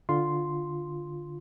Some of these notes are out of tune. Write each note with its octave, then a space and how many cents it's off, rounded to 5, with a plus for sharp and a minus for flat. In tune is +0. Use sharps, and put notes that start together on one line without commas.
D3 +0 F4 +0 C6 +0